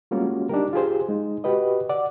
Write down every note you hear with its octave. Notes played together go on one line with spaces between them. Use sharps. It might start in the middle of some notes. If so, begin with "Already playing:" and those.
G3 G#3 A#3 C#4 F4 F#4
D4 D#4 G4 A#4
F4 G4 G#4 C5
G#3 D#4
F#4 G4 B4 D#5
D5 F#5